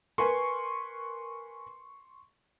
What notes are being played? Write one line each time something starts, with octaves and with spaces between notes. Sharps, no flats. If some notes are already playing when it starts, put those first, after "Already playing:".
A#4 B4 G#5 C6 C#6